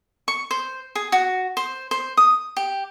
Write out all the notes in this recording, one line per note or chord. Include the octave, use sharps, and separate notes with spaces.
C#6
C5
G#4
F#4
C5
C5
D#6
G4